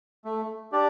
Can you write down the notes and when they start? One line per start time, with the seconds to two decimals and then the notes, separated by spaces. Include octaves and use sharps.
0.25 A3
0.72 D4 G4 D5